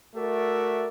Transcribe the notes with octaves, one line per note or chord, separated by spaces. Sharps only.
A3 F#4 A#4 D5 E5